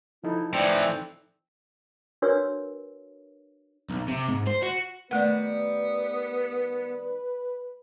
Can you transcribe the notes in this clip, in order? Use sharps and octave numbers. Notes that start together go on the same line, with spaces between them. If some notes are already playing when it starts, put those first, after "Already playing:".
F3 D#4 E4 A4
A2 E3 C4 D5
D4 F#4 A#4 B4 C#5 E6
B1
C3
G#2
C5
F#4
D#3 G3 A3 B3 B4 F#5